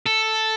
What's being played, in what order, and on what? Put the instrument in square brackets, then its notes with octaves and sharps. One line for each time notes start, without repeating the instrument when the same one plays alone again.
[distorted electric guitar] A4